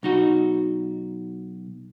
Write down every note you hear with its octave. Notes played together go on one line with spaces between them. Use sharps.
B1 D#4 F#4